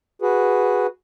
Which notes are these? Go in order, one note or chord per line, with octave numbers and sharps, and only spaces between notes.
F#4 G#4 B4